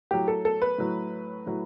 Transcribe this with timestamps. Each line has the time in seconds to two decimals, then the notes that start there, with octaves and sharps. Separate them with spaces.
0.11 A2 F#3 G4
0.28 A4
0.45 A4
0.62 B4
0.78 A2 F#3
1.46 A2 F#3